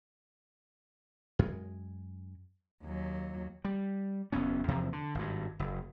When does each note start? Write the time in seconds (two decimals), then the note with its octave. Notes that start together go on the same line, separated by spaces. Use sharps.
1.39 F#2 G#3
2.84 D#2 F#3
3.65 G3
4.32 F#1 E2 B3 C#4
4.68 E2 C3 F3 A#3
4.93 D3
5.15 G#1 G2
5.59 F#1